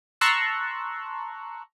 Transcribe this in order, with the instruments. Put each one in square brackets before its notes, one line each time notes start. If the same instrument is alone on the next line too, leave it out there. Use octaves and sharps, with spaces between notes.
[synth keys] A5 A#5 C6 C#6 E6 F#6